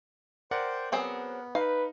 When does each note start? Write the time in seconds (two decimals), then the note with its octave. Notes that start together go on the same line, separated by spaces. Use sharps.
0.51 A#4 C5 D5 F#5 G5
0.92 F#3 B3 C4 G#4
1.55 D#4 B4 F5